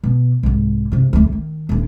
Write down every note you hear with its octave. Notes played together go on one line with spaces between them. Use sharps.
B2
C2 G#2
G2 C3
D2 A3
D#3
D#1 D4